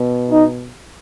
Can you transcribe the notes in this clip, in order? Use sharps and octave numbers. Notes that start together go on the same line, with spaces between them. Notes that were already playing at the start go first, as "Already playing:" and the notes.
Already playing: B2
D#4